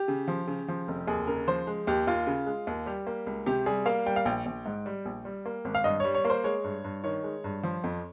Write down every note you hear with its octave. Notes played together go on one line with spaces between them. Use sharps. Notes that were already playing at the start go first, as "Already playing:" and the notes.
Already playing: G4
C#3
F3
C#3
F3
F1
D#2 G#4
C#3 A#4
F3 C5
G#3
D#2 G4
D#2 F4
C#3
G#3
D#2
G3 G4
A#3
C#2
C3 G4
G3 G#4
A#3 F5
G3 G5
F5
A#1 G5
A#1
G#2
G3
A#1
G3
A#3
G#1
F5
G2 D#5
G3 C#5
C#5
A#3
C5
G#3 C#5
G2
G2
D#3 C#5
G#3
G2
F3
F2